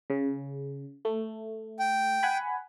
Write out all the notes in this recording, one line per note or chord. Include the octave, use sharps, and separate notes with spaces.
C#3
A3
G5
F#5 G#5 B5